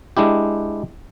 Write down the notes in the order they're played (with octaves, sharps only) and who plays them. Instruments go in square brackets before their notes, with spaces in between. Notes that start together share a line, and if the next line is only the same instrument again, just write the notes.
[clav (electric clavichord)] G#3 D4 E4 G4